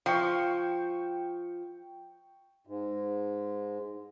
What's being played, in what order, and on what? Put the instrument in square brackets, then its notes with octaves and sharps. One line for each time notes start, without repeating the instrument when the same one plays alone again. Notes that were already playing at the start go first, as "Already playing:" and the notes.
[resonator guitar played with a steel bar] F3 [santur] G5 C#6
[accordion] G#2